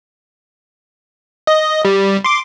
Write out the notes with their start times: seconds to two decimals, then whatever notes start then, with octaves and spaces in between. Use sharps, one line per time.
1.47 D#5
1.85 G3
2.24 C6 D6